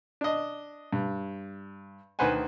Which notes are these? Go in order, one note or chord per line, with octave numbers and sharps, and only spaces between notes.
D4 D#5
G2
D2 D#3 B4 C5 F#5 G#5